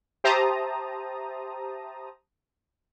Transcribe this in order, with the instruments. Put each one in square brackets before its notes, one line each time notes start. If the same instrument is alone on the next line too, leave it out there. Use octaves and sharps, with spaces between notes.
[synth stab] G4 C5 E5 A5 A#5 D#6